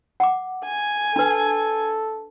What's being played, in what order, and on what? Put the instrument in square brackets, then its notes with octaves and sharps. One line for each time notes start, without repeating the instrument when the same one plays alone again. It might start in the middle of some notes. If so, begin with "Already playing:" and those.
[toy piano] F#5 D6
[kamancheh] G#5
[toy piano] D4 B4 [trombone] A4